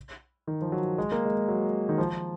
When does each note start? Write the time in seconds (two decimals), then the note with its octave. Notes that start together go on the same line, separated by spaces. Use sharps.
0.47 D#3
0.62 F3
0.72 F#3
0.98 G#3
1.12 A#3
1.25 G#3
1.48 F#3
1.89 D#3
1.98 F3